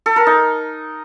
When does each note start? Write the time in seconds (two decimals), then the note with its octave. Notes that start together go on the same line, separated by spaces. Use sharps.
0.06 A4
0.16 A#4
0.27 D#4